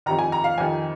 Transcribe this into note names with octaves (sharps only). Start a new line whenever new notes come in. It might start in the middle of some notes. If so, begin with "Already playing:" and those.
F2 C3 D#3 A#5
G#5
A#5
F5
F2 C3 D#3 G#5